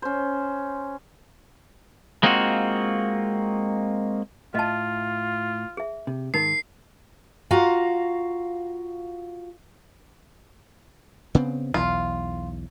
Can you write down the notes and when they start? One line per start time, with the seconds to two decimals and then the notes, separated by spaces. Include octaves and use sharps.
0.02 C#4 C5
2.23 G#3 A#3 C4 D#4 F4 F#4
4.55 A2 F4 D#5 E5 A5
5.77 G#4 E5
6.07 C3
6.34 G#2 D#3 D#4 A#4 C7
7.51 F4 F#4 F5 A#5
11.35 C#3 B3 C4
11.74 B1 E2 F4